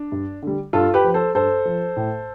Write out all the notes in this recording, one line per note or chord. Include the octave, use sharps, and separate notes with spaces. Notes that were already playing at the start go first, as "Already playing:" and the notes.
Already playing: D4
G2
D3 G3
G2 F4 A4
G4 B4
F3
A4 C5
G2 A4 C5
F3
A2